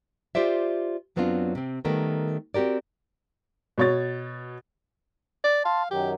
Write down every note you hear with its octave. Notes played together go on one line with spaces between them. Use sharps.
F4 G4 C5 D5 E5
F#2 F#3 B3 C4 D4 F4
C3 C4
D#3 G3 A3 B3 A#4
C4 F#4 G4 A#4 D5
B2 C#5 A6
D5
F5 A5 C6
F#2 D#3 F#3 G4